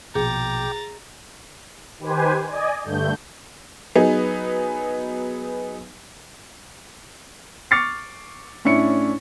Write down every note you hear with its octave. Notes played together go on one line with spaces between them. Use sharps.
A#1 B2 G#4 G5 A#5 D6 G6 A6
D#3 G4 B4 C5 G#5
D5 D#5 G#5
G2 D3 A3 G6
F#3 B3 D#4 G#4
C#6 D6 F6 A6 C7 C#7
A2 C#4 D4 E4 C#7